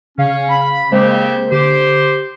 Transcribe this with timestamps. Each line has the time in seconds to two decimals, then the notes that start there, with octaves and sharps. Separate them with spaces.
0.18 C#3 C#4 F5
0.49 B5
0.92 C#3 G#3 A#3 C4 G4 C5
1.52 D3 G4 C5